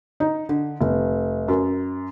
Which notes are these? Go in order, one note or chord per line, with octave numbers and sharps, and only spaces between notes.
D#4
D3
F1
F#2